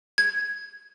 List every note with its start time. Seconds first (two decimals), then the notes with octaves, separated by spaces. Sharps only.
0.18 G#6